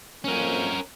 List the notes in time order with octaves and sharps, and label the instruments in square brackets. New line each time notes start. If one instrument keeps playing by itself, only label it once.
[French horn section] F2 A#3 C4 [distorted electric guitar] C#4 A#4